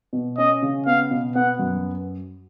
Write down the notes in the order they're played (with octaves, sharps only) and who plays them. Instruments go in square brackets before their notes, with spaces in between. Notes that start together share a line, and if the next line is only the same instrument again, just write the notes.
[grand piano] B2
[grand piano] C#4 [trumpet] D#5
[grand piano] C#3
[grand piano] B3 [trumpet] F5
[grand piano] B2
[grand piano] B3 [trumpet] F#5
[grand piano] F#2